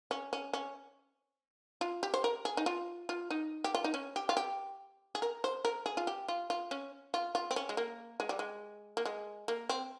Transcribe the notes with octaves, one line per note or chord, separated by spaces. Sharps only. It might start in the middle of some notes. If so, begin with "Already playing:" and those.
C#4
C#4
C#4
F4
G4
C5
A#4
G#4
D#4
F4
F4
D#4
G4
F4
D#4
C#4
G4
F4
G4
G#4
A#4
C5
A#4
G#4
F4
G4
F4
F4
C#4
F4
F4
C4
C#4
G#3
A#3
G#3
G3
G#3
A#3
G#3
A#3
C4